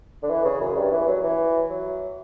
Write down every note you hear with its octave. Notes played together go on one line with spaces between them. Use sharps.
D3
E3
C#3
F#2
G2
E3
F#3
E3
F#3